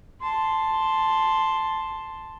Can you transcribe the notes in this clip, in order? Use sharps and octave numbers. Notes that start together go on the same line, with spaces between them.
A5 C6